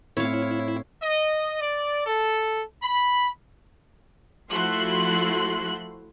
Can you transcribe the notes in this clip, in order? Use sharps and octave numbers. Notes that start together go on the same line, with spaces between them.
A2 C4 E4 C#5 F5
D#5
D5
A4
B5
F3 A3 E4 F#4 C6 F#6